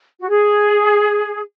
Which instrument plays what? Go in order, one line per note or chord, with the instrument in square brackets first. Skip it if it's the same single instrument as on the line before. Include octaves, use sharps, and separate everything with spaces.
[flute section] F#4
G#4